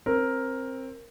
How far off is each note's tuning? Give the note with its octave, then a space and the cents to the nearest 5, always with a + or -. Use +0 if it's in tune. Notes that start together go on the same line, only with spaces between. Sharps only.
C4 +20 A#4 +5